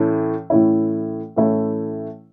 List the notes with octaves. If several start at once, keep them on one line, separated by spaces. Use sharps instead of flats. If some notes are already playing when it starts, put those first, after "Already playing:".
Already playing: A2 E3 A3 C#4 E4
A2 E3 A3 C#4 E4
A2 E3 A3 C#4 E4